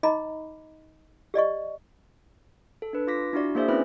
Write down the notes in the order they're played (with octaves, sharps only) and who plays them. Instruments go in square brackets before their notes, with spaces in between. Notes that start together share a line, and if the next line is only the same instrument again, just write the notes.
[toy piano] D#4 D#5 A#5 B5 D6
G4 D5 D#5 C#6
[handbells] A4
D4 B4
F4 D6 A#6 B6
D4 E4 F#4 D5
A#3 D4 G#4 C5 D5 E5
C4 C#4 E4 B4 D5 B5